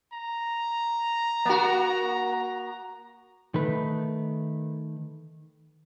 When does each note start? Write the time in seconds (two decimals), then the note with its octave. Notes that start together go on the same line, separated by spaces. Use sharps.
0.13 A#5
1.45 A#3 F#4
3.54 D#3 A3 B4